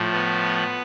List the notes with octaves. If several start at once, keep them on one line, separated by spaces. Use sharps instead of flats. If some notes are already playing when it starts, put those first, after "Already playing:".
Already playing: A2 F3
B3